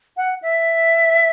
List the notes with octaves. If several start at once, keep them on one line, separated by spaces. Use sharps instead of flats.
F#5
E5